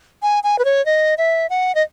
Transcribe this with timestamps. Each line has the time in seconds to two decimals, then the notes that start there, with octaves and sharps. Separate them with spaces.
0.22 G#5
0.43 G#5
0.59 B4
0.65 C#5
0.86 D#5
1.18 E5
1.50 F#5
1.75 D#5